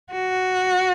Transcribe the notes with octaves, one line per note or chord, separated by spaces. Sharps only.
F#4